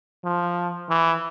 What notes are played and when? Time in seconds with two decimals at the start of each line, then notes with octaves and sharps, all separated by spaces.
0.24 F3
0.90 E3